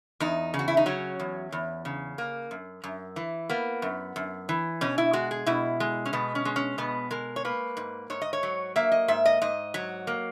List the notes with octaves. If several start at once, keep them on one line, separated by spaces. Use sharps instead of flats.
E2 D#4
C#3
F#4
E4
D#4
F#3 C#4
E2
E2
C#3
A#3
F#2
F#2
E3
A#3 B3
F#2
F#2
E3
B2 C#4
E4
G#3 F#4
G#4
B2 E4
G#3
C#4
B2 B3
C#4
G#3
C#4
B2 B3
G#3 A#4
C#5
A#3 B4
G#2
G#2 C#5
D#5
C#5
F#3
A#3 E5
D#5
G#2 E5
D#5
G#2 D#5
F#3
A#3